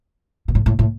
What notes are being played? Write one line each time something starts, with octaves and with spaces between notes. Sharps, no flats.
B2
A2
A2
A2